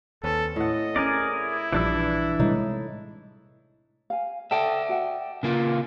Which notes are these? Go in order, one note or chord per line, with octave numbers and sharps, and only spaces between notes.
D#2 C4 C#4 A4 B4
A2 D#5 F#5
C4 C#4 G#4 A#4 D5
E4
A#1 G2 E3 F3 D4 E6
A2 C3 G3 G#3 D#4
F5 G#5
A4 D5 E5 G5 A5
F#4 F#5 G5
C#3 A#3 F4